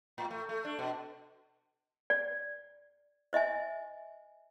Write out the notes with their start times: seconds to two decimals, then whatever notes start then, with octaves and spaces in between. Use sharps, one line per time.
0.18 A2
0.31 A3
0.49 A3
0.65 D4
0.79 B2
2.10 D5
3.33 C5 D#5 E5 G#5